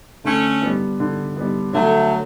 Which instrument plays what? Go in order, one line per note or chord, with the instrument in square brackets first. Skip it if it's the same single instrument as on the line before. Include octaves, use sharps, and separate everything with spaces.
[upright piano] D3 [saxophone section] A3 C#4
[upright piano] G3 B3
D3
G3 B3
[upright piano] D3 [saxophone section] F#3 A3